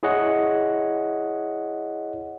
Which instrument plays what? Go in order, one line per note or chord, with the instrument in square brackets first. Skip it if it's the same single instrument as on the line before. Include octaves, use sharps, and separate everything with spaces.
[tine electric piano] E4 G#4 C#5 D#5 F#5